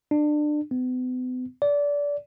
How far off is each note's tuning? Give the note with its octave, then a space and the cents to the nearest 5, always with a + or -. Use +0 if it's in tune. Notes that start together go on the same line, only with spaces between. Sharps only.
D4 +25
B3 +40
D5 -25